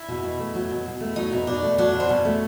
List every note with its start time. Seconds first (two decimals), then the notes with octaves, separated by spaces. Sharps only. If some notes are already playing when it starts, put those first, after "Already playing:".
Already playing: E4
0.08 B2
0.23 B2
0.39 A3
0.55 F#3
0.70 B2
0.86 B2
1.00 A3
1.16 F#3 D#4
1.32 B2
1.47 B2 D4
1.62 A3
1.78 F#3 D4
1.93 B2
2.00 C4
2.09 B2 C#4
2.25 A3